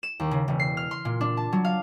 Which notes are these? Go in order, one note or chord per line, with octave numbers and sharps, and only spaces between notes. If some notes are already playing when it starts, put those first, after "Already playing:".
E7
D#2
C#3
E1
C7
F6
C6
A#2
D4
A5
F#3
F5